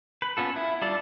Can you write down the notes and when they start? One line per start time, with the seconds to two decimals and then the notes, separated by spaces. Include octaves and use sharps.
0.22 B4
0.37 B3 C#4 F4 A4
0.56 E4
0.82 G3 D4 F4 A4 D5